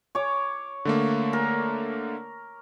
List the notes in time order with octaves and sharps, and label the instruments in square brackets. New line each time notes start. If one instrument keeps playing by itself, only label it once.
[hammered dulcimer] C#5 D6
[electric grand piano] D3 A3 A#3
[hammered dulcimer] A#4